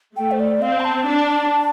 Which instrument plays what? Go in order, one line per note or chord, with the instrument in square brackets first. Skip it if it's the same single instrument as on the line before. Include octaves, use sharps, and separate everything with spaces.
[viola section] A3 [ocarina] G5
[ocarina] C5
D5
[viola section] C4 [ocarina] F5
[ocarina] C6
A5
[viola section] D4